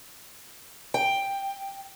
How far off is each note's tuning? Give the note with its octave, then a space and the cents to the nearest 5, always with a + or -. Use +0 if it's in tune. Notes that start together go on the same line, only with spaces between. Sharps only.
G5 +5